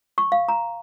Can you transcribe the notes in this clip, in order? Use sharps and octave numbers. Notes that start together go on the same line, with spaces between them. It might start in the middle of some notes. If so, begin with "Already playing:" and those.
C#6
F5
A#5